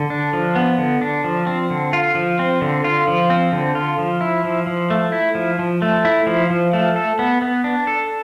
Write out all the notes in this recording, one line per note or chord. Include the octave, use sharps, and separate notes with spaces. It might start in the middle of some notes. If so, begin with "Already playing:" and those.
Already playing: D3
D4
F3
B3
D3
D4
F3
C4
D3
F4
F3
C4
D3
F4
F3
C4
D3
F4
F3
E4
F3
F3
A3
E4
F3
F3
A3
E4
F3
F3
A3
A4
B3
B3
D4
A4